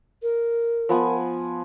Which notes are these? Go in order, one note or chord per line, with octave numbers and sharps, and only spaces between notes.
A#4
F3 B3 G#5